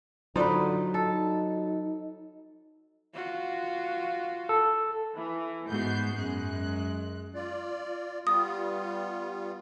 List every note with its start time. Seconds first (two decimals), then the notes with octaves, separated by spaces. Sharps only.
0.36 D3 F#3 D#4 F4 B4 C5 D5
0.94 D#4 A4
3.13 F4 F#4
4.49 A4
5.14 E3
5.69 G#2 B3 F#4 G6 C7
6.16 F#2 G#3 F#6
7.34 F4 D5
8.27 G3 B3 F4 D#6